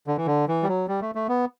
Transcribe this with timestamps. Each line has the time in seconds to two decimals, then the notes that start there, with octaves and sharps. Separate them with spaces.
0.07 D3
0.17 E3
0.26 D3
0.48 E3
0.63 G3
0.68 F#3
0.88 G3
1.02 A3
1.15 A3
1.29 B3